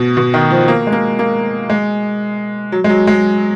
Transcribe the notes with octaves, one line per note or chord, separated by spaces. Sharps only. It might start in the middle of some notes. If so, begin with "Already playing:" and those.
Already playing: B2
B2
D#3
F3
A#3
G#3
A#3
A#3
G#3
F#3
G#3
F#3
G#3